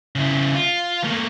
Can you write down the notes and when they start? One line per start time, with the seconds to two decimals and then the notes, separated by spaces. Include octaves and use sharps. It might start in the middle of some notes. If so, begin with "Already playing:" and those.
0.15 C#3 E4
0.55 F4
1.04 A3 A#3